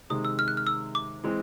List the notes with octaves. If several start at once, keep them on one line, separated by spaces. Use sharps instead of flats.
C3 D#3 G#3 D#6
E6
F6
F#6
F6
E6
D6
E3 G#3 C4